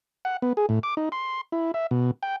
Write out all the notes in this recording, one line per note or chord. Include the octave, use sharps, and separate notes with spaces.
F#5
B3
G#4
A2
D6
D#4
C6
E4
E5
B2
G5